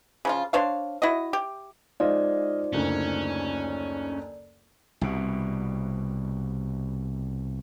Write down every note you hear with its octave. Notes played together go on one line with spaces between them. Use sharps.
C#3 F3 F4
D4 C5 C#5 F5
E4 F#4 D#5
G4
G#3 D#4 F4 C5 D5 D#5 F5
F#1 D2 C#4
C2 B2